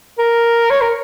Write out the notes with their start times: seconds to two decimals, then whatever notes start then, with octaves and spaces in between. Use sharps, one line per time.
0.19 A#4
0.70 C#5
0.81 A#4